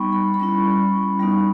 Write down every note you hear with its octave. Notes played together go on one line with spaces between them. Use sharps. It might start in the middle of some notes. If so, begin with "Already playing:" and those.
Already playing: G3 B3 D#4 B5 C#6
B5
B5
G3 C#4 E4 C#6
G3 B3 D#4 B5